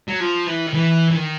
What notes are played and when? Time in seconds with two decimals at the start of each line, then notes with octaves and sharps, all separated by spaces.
0.08 F#3
0.20 F3
0.47 E3
0.67 D#3
0.74 E3
1.10 E3
1.15 D#3